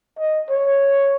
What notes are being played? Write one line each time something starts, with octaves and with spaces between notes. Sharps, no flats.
D#5
C#5